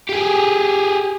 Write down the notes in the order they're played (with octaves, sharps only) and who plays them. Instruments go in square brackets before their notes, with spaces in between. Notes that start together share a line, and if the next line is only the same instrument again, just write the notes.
[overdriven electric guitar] G4 G#4